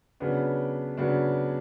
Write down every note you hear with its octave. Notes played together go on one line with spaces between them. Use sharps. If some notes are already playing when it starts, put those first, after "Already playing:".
C#3 F#3 B3 D4
C#3 F#3 B3 D4